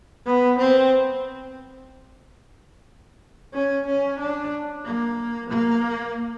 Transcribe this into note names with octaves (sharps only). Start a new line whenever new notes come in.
B3
C4
C#4
C#4
D4
A#3
A#3